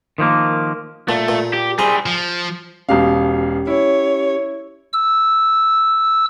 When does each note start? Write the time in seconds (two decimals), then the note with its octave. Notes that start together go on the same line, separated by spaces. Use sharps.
0.18 D#3 F3 A3 A#3
1.09 A#2 A3
1.29 A#2
1.53 G4
1.79 G3 C4 G#4 A#5
2.06 F3
2.89 E1 B2 C#4 G4 F5
3.67 E4 C#5
4.93 E6